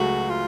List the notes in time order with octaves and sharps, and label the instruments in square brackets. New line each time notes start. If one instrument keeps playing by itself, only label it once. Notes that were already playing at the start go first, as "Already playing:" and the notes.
Already playing: [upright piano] C#2 C#3 F#3 A3 [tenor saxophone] F#4
[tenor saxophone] F4